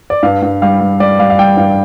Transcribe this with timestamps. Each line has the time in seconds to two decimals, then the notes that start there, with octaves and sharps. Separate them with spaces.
0.10 D5
0.23 G2 F5
0.42 G2
0.62 G3 F5
0.81 G3
1.00 G3 D5
1.19 G3 F5
1.30 F5
1.39 G3 G5
1.57 G2 F5